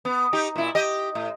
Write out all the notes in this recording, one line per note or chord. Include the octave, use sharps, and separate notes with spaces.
B3
D#4 G4
A#2 E4
G4 D#5
A2